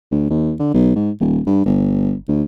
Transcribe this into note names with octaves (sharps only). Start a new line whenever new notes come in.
D2
D#2
D3
B1
G#2
D#1
G2
G1
D2